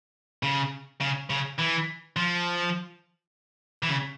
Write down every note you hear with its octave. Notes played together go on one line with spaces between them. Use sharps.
C#3
C#3
C#3
E3
F3
E3
C#3